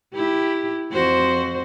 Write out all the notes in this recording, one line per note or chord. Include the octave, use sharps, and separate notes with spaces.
E4 G4
F2 F#4 C5